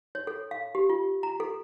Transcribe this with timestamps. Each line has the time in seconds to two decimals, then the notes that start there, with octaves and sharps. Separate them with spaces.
0.15 C#5
0.27 A4
0.51 F5
0.75 G4
0.90 F4
1.23 A#5
1.40 A4